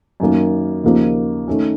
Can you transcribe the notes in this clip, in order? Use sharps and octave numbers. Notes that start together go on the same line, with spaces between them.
F#2 D#3 A#3
D#2 C#3 F3 A#3 D#4
D#3 A3 C#4